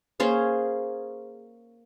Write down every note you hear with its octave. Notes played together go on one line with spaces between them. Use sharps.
A#3 C#4 G#4 C5